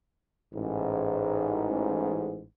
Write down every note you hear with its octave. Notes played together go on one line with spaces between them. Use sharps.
A1 G#2